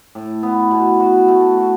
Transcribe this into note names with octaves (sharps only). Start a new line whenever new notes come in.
A2
B3
B2
F#4
A3
F#4